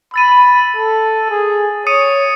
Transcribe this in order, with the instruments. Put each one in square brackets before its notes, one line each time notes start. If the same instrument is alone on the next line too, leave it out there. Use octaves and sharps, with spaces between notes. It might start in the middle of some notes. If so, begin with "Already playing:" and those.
[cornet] B5 [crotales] E6 A6 D#7
[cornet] A4
G#4
[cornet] C#5 [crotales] D#6 C#7 D#7